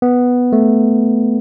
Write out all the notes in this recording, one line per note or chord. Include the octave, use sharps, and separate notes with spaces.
B3
A3